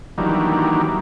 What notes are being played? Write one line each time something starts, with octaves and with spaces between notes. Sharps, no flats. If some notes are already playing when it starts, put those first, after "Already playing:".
D#3 E3 F#3 G3 A#3 D4